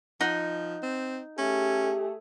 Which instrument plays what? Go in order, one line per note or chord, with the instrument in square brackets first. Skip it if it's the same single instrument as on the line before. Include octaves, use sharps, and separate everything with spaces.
[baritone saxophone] F3 [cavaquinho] D#4 F#5
[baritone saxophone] C4
[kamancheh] A3 G#4 [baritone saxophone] C#4 [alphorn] G4